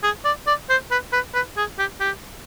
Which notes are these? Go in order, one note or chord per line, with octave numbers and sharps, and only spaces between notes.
G#4
D5
D5
C5
B4
B4
B4
G#4
G4
G4